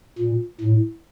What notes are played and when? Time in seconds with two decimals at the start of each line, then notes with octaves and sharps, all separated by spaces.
0.19 A#2
0.61 A2